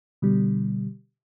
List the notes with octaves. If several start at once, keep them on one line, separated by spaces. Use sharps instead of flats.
B2 D3 G3